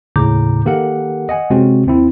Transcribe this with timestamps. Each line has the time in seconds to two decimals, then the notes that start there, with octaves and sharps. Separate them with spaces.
0.16 D#2 A2 C#3 A#5 D6 G6
0.66 D#3 A#3 G4 A4 A#4 F#5
1.29 D#5 F#5 G#5
1.50 C3 G#3 C4 C#4 F#4
1.86 D#2 C4 E4